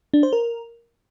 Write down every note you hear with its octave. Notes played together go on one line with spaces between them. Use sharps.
D4
C5
A#4